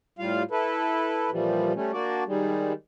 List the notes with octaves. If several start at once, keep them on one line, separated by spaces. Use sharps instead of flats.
A2 G3 F4 F5
E4 A4 B4
A#2 E3 F3 G3
G3 A3 C#4
A#3 D4 F#4 D5
D#3 G3 G#3